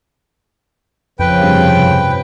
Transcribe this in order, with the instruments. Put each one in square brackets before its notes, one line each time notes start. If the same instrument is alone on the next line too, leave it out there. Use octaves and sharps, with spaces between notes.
[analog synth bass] F2 [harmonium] C#3 F3 [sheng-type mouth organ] B4 G5
[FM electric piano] G2 C3